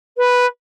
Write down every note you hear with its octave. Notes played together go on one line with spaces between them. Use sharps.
B4